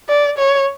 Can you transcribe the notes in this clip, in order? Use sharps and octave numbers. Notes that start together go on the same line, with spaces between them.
D5
C#5